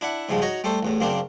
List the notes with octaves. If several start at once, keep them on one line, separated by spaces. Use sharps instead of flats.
D4 E4 E5 F#5
G#2 C#3 F3 G3 G#3
D#4 F#4 C#5 A#5
G3 A3 A4 C5
A1 E2 A2
F#2 C#3 A#3 C4 D4